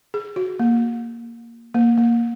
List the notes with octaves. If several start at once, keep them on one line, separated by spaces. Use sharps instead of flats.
G#4
F#4
A#3
A#3
A#3